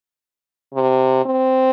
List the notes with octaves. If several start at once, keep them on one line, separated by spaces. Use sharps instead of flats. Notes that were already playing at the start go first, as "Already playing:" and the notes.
C3
C4